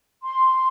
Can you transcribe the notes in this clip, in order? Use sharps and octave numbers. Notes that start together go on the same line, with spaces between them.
C6